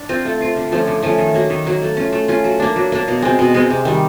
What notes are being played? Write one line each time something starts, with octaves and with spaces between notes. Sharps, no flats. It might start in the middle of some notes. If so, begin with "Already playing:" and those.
Already playing: D4
C4 F4
A3
C4 F4
D3
F3 A3 C#4
D3
F3 A3 C#4
D#3
F#3 A#3
D#3
F#3 A#3
A3
C#4 F4
A3
C#4 F4
F#3
A#3 D4
F#3
A#3 D4
B2
G#3 C4
B2
G#3 C4
C3
D#3 G3